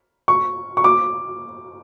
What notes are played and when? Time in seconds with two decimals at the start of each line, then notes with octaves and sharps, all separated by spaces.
0.28 C#6
0.77 C#6
0.84 D6